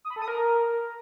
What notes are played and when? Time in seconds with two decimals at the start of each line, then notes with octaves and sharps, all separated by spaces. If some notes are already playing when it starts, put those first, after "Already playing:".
0.05 D#6
0.10 B5
0.16 A4
0.22 D#6
0.28 A#4